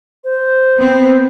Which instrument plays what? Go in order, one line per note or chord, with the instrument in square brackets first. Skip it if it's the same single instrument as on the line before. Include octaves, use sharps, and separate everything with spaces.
[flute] C5
[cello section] B3 C4